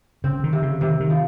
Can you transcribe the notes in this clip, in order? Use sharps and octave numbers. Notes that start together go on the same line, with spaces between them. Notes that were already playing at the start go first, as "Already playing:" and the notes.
C#3 C4
D#3
C3
C#3
C3 D#3
D#3
F3